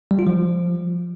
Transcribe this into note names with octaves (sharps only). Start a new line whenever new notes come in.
G3
F4
F3